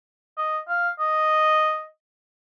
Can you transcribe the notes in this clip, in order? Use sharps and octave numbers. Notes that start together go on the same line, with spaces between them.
D#5
F5
D#5